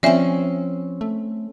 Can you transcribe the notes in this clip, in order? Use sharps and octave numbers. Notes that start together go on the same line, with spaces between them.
F3 C4 C#4 D5 E5 G#5
A3